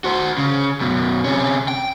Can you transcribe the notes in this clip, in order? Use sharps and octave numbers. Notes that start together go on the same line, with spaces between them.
F#4 C5
C#3
F#2 B2
C3 C#4
G5